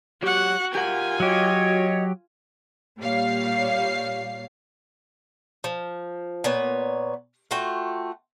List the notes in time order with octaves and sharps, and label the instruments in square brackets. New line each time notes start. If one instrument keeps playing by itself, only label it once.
[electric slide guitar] F#3 G4 [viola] F#4 F#5
[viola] F4 G#5 [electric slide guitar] G4 A#4 F#5
[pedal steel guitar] F#3 G4 [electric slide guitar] F#4 [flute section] C#5 D#5
[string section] A#2 G3 C#5 F5 C7
[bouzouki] F3
A#2 B3 C#5
A3 F4 F#4 G5